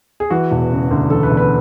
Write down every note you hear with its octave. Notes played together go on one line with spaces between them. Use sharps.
G#4
E3 F#4
E1
C#3
D2
E3 A4
B4
E1
B4